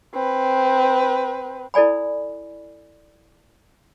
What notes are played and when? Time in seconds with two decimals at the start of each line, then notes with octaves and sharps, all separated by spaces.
0.14 C4 B4
1.74 E4 A4 D5 G#5 B5